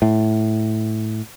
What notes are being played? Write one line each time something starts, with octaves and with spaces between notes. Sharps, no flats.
A2